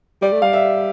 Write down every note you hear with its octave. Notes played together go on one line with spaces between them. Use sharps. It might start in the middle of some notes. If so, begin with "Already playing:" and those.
G3 D5
A3
G3 F5
E5